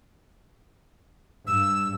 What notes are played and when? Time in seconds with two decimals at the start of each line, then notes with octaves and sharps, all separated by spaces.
1.47 G2 E6